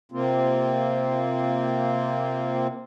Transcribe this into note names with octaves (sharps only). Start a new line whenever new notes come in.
C3 A#3 C4 F4